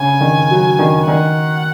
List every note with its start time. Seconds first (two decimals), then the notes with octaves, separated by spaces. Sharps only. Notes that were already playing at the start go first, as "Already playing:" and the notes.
Already playing: C#3 G#5
0.21 D#3
0.51 F#3
0.79 D#3
1.08 D#3 F#5